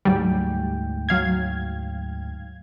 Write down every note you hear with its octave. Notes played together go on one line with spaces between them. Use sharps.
D2 G#2 F#3 G3 G5
F#3 F5 G#6